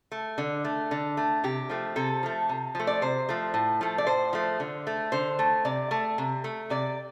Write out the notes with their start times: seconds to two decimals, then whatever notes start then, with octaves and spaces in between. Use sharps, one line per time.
0.12 A3
0.38 D3
0.65 A3
0.91 D3
1.17 A3
1.44 C3 G4
1.69 F3 A3
1.96 C3 A4
2.23 F3 A3
2.49 C3
2.75 F3 A3
2.87 D5
3.02 C3 C5
3.29 F3 A3
3.54 A2
3.81 F3 A3
3.98 D5
4.07 A2 C5
4.33 F3 A3
4.60 D3
4.87 A3
5.12 D3 C5
5.39 A3
5.65 C3 D5
5.91 A3
6.18 C3
6.44 A3
6.70 C3 D5